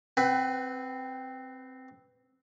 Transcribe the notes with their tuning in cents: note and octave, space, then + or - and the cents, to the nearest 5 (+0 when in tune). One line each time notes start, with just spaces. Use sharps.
C4 +0 B4 +15 F#5 +30